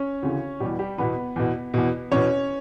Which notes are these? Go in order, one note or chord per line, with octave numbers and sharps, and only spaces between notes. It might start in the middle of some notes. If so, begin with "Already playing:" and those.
Already playing: C#4 C#5
D2 C#3 E3
E2 B2 G3 G4
G3 G4
E2 B2 B3 B4
E2 B2
E2 B2
E2 B2 C#4 C#5